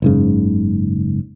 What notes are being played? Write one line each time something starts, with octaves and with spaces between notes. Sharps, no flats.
F#1 G#2 C#3